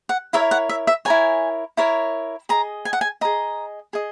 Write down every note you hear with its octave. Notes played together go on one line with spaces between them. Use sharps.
F#5
E4 A#4 C#5 E5
F#5
E5
E5
E4 A#4 C#5 G#5
E4 A#4 C#5
G#4 D#5 A#5
G#5
F#5
G#5
G#4 D#5 A#5
G#4 D#5